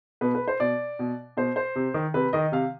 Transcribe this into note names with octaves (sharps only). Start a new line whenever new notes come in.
B2 B4
B4
C5
B2 D5
B2
B2 C5
C5
C3
D#3
C3 B4
D#3 D#5
C3 F5